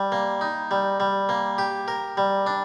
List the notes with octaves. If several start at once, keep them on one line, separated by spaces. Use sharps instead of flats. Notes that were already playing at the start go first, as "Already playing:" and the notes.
Already playing: G3
A#3
D#4
G3
G3
A#3
G4
A#4
G3
D4